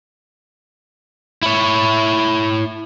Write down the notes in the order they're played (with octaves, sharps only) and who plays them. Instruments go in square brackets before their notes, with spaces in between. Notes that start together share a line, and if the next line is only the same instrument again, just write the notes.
[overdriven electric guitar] E4 C#5